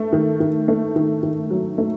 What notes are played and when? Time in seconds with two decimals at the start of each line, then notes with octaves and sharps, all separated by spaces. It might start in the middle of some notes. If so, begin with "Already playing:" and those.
Already playing: A3
0.13 D#3
0.40 D#3
0.68 A3
0.96 D#3
1.23 D#3
1.50 F#3
1.78 A3